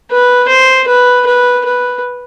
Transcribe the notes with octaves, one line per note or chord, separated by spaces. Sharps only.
B4
C5
B4
B4
B4